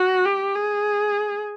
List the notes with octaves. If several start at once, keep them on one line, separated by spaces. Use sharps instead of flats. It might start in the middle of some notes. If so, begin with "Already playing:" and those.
Already playing: F#4
G4
G#4